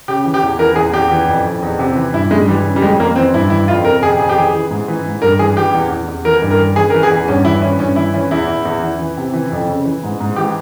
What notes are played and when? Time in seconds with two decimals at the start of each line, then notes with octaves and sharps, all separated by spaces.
0.08 C#3 G4
0.25 E3
0.34 G4
0.42 E2
0.59 E3 A#4
0.76 E2 G#4
0.93 E2 G4
1.11 E3
1.28 F2
1.45 F2
1.63 E2
1.79 C3
1.96 E3
2.13 G2 E4
2.31 G2 G#3
2.48 E3 G3
2.64 C#3
2.76 G3
2.82 F2 G#3
2.99 F2 A#3
3.16 E3 C4
3.34 G2 E4
3.50 E3 E4
3.68 F2 F4
3.85 C3 A#4
4.02 F2 G#4
4.19 F2 G#4
4.29 G4
4.36 E3 G#4
4.53 E3
4.70 G#2
4.88 E3
5.06 G#2
5.22 G2 A#4
5.39 E3 G#4
5.56 E3 G4
5.74 E2
5.90 E2
6.08 E2
6.25 E3 A#4
6.42 G2
6.51 A#4
6.59 E3
6.76 E3 G#4
6.90 A#4
6.94 E3
7.03 G#4
7.11 E2
7.28 G2 C#4
7.45 E3 E4
7.62 E3 C#4
7.79 G2 C#4
7.96 E3 E4
8.14 E3 C#4
8.31 E2 E4
8.48 E2
8.65 E2
8.82 E3
8.99 E3
9.17 C3
9.34 E3
9.52 F2
9.68 C#3
9.85 E3
10.03 G#2
10.20 G#2
10.36 E3 G4